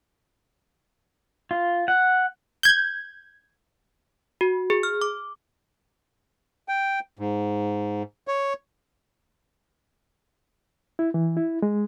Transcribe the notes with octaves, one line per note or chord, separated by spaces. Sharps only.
F4
F#5
G6 G#6
F#4
G#4
F6
D6
G5
G#2
C#5
E4
E3
E4
G#3